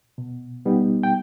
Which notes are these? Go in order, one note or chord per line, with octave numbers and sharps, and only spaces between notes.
B2
G3 B3 D#4
G5